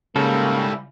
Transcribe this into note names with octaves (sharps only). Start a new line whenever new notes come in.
G#2 C#3 G3 A#3 E4 A4